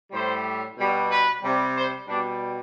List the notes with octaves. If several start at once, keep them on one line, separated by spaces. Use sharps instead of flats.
A2 G3 C5
B2 G3
B4
C3 G3
C5
B2 G3 D4